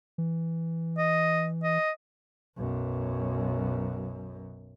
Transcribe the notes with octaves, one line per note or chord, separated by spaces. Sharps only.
E3
D#5
D#5
B1 F#2